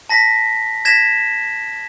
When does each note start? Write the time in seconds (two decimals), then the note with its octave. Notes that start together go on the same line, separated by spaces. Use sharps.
0.09 A5 A#6 B6
0.85 G#6 A#6 B6 E7